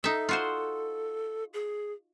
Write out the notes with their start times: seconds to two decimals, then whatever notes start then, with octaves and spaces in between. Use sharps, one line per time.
0.04 D#4 A4 E5
0.29 F4 F#4 C5
1.53 G#4